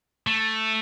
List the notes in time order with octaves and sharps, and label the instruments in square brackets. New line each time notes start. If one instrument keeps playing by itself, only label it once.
[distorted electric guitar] A3